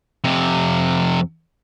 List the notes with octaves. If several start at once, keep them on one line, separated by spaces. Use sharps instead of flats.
F2 C3